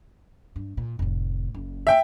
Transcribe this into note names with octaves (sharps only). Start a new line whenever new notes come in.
G2
A#2
F1 A2
F#1
E5 G5